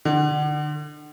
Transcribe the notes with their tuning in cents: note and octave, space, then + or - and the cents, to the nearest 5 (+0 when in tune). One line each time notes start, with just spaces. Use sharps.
D3 +30